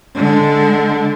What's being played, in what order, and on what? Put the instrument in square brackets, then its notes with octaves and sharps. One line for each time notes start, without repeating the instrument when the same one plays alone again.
[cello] D3 G#3